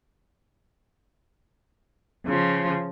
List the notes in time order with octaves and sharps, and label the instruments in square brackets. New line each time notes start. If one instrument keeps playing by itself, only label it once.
[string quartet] C#3 F3